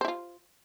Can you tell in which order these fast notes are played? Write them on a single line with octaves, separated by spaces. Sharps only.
C5 E4 F4